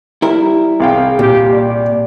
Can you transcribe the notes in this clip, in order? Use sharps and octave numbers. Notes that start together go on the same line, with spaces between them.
G3 E4 A#4
C2 G#4 F5 G5
A#2 G4
D5